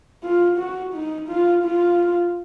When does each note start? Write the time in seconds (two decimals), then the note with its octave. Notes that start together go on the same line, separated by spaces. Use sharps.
0.23 F4
0.58 F#4
0.94 D#4
1.29 F4
1.63 F4